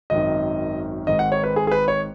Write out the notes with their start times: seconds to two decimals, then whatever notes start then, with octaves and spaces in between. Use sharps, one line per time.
0.10 G#1 F#2 D#3 D#5
1.07 G#1 G#2 D#3 D#5
1.19 F#5
1.32 C#5
1.44 B4
1.56 G#4
1.67 G#4
1.71 B4
1.88 C#5